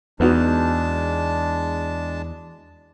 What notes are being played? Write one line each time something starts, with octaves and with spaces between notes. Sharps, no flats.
E2 G#3 B3 D4 D#4 F#4 A5